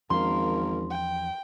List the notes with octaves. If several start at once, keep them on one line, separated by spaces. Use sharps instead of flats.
G#1 E2 F3 A#3 C#4 A#4 C6
G5